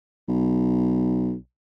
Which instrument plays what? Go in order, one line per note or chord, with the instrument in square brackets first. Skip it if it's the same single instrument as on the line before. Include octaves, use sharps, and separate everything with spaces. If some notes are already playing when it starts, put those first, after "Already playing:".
[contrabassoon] B1